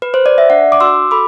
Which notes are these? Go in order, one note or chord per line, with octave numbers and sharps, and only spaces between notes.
B4
C5
D5
E5
D4 D5 F#5
D6
F#4 C6 E6
A4 B5 D6